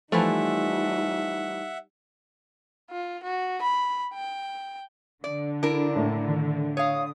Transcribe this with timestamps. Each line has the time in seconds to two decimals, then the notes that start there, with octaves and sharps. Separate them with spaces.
0.12 E3 F3 G3 A3 D#4 E5 F#5
2.90 F4
3.23 F#4
3.62 B5
4.14 G5
5.24 D3 D5
5.63 D4 E4 A#4
5.96 A2
6.29 D#3
6.77 C#5 F5 D#6